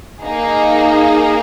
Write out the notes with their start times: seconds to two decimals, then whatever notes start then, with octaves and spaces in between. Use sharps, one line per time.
0.22 A#3 D#4 G#4